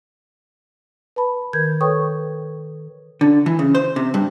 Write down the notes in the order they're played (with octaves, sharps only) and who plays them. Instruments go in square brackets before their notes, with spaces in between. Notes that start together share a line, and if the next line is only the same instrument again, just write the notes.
[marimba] B4 A5 B5
D#3 A#4 G6 G#6
A4 B4 C#5 G5 C#6 D#6
[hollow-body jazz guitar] D3
E3
C#3
C5
C3
G2